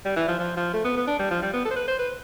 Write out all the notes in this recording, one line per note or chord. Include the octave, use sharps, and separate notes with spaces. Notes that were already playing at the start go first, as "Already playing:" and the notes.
G3
E3
F3
F3
F3
A3
B3
B3
D4
G3
F3
G3
B3
A4
C5
B4
C5
B4